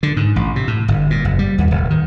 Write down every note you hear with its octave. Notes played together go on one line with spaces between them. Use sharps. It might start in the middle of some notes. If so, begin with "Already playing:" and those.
D3
G#2
A1
C3
A2
G1
A#2
F#1
G3
D#2
D1
D#3